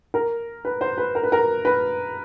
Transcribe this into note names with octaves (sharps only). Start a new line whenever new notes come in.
A#4
B4
C5
B4
A#4
B4
A#4
B4